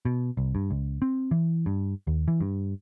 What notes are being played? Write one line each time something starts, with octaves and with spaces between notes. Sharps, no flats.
B2
C2
G2
C#2
C4
E3
G2
D#2
E3
G2